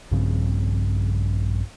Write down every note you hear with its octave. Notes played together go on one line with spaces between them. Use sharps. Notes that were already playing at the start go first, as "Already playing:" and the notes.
A#1 G2 C#3 C4